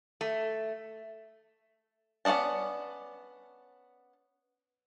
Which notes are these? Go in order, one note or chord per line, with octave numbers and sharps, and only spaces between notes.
A3
B3 C#4 D5 D#5 A5